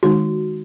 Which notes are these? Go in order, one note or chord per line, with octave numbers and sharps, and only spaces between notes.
D#3 G#3 D#4 F#4